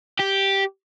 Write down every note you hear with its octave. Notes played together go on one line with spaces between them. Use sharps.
G4